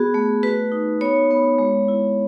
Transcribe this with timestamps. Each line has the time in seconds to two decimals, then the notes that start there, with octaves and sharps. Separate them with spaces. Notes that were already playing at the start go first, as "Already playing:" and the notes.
Already playing: B3 F#4 G#4
0.14 A3
0.43 F#4 B4
0.72 D#4
1.01 B3 C#5
1.31 B3
1.58 G#3
1.88 E4